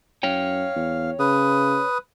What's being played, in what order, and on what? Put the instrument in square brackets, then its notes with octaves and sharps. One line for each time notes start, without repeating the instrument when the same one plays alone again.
[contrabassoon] F#2 [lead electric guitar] C#5 G5 [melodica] F5
[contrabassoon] E2
[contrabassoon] C#3 [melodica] B4 D#6